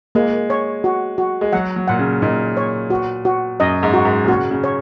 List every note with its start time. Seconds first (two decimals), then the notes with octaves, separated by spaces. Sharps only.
0.15 G#3 A#3
0.50 C#5
0.84 F#4
1.18 F#4
1.41 G#3
1.53 F#3 F#5
1.76 F#3
1.88 A#2 F#5
1.99 C#3
2.22 A#2 D#4
2.57 C#5
2.90 F#4
3.25 F#4
3.60 F#2 D#5
3.83 G#2
3.94 F#4
4.05 G#2
4.24 A#2
4.28 C#3 F#4
4.51 C#3
4.64 C#5